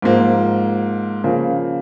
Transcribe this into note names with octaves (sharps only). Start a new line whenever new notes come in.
G#2 F3 A#3
C#3 F3 A#3